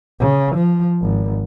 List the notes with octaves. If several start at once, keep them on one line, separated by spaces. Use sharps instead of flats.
C#3
F3
G#1